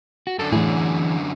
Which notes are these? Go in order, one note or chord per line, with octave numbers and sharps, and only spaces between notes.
F#4
F#2 D3 A4
A2 E3 G#4